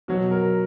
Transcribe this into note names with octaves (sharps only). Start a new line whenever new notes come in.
B2 F#3 F#4
A#4